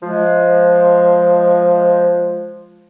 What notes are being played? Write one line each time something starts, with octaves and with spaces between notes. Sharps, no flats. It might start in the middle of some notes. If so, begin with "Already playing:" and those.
F3 G#3